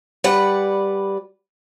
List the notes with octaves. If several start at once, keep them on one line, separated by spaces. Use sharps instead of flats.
G3 B4 D5 F#5